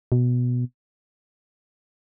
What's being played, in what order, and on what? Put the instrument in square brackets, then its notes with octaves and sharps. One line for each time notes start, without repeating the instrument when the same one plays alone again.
[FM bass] B2